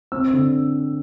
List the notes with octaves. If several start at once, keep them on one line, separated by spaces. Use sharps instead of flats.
C4 E6
D3